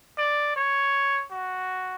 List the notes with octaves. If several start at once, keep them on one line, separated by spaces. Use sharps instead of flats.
D5
C#5
F#4